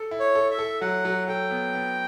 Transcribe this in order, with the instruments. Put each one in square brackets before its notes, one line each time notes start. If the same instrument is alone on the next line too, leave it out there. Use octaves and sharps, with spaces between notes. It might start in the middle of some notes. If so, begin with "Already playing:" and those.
Already playing: [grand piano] A4
E4
[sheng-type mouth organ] C#5
[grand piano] A4
[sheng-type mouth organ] E5
[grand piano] A4
[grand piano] F#3 [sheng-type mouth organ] F#5
[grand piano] F#3
[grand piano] A4 [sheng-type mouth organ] G5
[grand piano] B3
B3